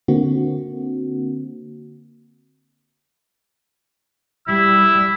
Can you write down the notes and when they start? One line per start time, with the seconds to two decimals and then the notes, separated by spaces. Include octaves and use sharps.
0.08 D3 A#3 C4 F#4
4.48 G3 E4 E6